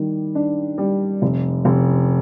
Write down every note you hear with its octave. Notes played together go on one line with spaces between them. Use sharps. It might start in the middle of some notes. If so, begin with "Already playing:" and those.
Already playing: D#3 G3
D4
G3
F1
F1